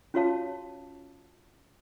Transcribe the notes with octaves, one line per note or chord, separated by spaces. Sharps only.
C#4 F4 F#4 C#5 F5 A5